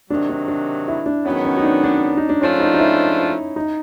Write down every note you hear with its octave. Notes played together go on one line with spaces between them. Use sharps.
C3 D#3 F#3 D4
D4
D4
E4
D4
G#2 D#3 F#3 B3 C#4
C#4
D#4
D4
D4
D#4
D4
G#2 F3 A3 C#4 D4 F4
D#4
D#4
E4
D#4